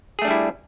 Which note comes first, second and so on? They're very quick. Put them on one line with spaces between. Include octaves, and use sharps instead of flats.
G#4 A3 D4 G3 E4